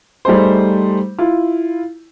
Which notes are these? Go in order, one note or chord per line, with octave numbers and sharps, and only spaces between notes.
G3 A3 D#4 G#4 C5
E4 F4